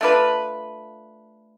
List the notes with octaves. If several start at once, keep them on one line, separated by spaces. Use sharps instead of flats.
A3 D4 F4 B4